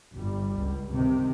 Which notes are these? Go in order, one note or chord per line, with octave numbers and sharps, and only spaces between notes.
G1 G3
C#2
C3 D#3